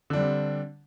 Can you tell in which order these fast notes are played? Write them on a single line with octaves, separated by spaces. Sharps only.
D3 D4 G3 C4